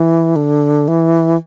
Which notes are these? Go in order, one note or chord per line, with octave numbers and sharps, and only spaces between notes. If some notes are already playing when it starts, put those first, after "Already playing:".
Already playing: E3
D3
E3